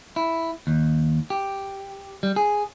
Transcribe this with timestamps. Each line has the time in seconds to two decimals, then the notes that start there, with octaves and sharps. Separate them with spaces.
0.16 E4
0.67 D#2
1.30 G4
2.23 G3
2.36 G#4